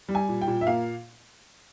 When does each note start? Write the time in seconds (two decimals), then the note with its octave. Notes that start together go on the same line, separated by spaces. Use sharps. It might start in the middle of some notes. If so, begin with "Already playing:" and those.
0.09 G3
0.15 G#5
0.29 A#2
0.41 G5
0.48 A#2
0.61 E5
0.67 A#3 F5